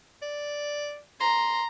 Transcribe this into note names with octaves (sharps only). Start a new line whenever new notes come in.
D5
A#5 C6